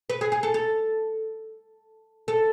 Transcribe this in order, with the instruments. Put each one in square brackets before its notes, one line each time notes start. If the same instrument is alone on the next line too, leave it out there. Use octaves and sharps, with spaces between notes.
[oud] B4
G#4
G#4
A4
A4
A4